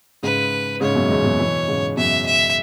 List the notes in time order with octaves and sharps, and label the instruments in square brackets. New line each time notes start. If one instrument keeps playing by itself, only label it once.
[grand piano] G#2 C#3 [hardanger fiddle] B4
[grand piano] G#2 C#3 [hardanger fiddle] C#5
[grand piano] F#2 B2
E2 G#2
F#2 B2
B2 E3
G#2 C#3
[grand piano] F#2 B2 [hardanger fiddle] E5
[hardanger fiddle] E5